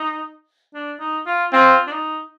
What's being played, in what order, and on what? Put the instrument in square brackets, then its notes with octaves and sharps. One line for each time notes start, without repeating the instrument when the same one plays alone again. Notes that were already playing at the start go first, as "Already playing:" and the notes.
Already playing: [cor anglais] D#4
D4
D#4
F4
[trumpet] C4 [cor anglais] F4
[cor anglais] D4
D#4